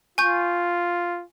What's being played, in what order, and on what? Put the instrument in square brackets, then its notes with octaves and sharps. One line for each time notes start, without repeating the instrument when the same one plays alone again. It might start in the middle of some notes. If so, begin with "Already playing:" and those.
[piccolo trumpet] F4 [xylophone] G#5 C#6 G6